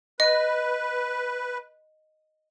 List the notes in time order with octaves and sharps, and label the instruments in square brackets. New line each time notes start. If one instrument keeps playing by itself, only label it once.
[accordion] B4 [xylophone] D#5